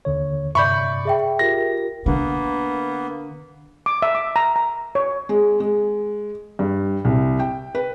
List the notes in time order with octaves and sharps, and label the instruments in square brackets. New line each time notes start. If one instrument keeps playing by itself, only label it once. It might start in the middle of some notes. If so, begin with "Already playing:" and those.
[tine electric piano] D#2 D3 C#5
[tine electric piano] G2 C3 [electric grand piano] D5 B5 C#6 [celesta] E5 G6
[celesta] G#4 E5 G5
[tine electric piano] F4 G4 A#4 [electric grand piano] A#6
[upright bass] D3 [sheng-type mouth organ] A#3 B3
[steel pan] D6
E5
D6
A#5
A#5
C#5
[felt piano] G#3
G#3
G2
C2
G5
B4